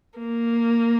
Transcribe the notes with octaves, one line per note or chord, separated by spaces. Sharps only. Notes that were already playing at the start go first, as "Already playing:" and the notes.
A#3